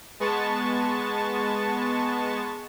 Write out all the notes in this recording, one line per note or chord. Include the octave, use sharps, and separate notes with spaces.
G#3 B3 A5 C#6 A6